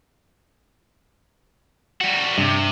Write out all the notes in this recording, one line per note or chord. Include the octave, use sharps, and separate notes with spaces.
G3 F#4
G2 C3